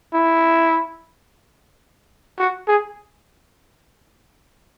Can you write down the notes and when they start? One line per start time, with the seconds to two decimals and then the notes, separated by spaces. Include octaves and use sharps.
0.13 E4
2.39 F#4
2.67 G#4